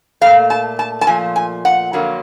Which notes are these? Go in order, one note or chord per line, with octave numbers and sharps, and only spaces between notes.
A#2 F3 A3 F5
A5
A5
A5
A#2 F3 A3 G#5
G#5
F#5
F2 D3 F#3 A#3